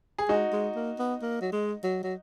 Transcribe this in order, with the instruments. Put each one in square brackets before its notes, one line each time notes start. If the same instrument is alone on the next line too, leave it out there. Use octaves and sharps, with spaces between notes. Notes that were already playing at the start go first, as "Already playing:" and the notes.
[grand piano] G#4
[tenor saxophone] G#3 [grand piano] D#4 F#4
[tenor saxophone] G#3
A#3
B3
A#3
F#3
G#3
F#3
F#3